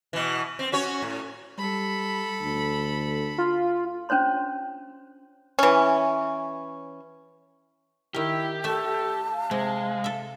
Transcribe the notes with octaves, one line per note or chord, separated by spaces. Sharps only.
B2 E3
C4
C#4 F#4 C#5
A2
G3 A4 B5
D2
F4
C#4 D4 C5 C#5 C6
E3 C#4
D#3 E4 G4 A#4
A3 A4 E5 A5
F5
C3 G#3
A4 E5